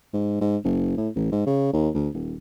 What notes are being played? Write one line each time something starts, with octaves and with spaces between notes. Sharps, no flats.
G#2
G#2
F#1
A2
A1
G#2
C#3
D#2
D2
D#1